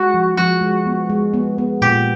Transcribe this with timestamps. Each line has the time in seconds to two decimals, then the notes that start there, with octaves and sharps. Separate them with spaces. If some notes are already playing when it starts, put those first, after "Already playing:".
Already playing: G#3 F#4
0.14 F3
0.37 F3 F#4
0.61 G#3
0.86 B3
1.10 G#3
1.34 B3
1.58 B3
1.82 A#2 G4